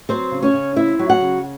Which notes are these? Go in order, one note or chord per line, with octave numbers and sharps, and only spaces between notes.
F#3 C4 C5
C#3
C#4 C#5
C#3
C4 E4 E5
F#3
F#4 F#5
C#3